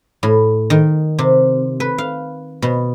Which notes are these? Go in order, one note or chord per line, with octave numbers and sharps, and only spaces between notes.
A2
D#3
C3
B4
F5
B2